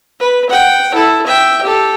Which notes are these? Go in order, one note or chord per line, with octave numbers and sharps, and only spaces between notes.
B4
F#5 G5
E4 A4
E5 G5
G4 A4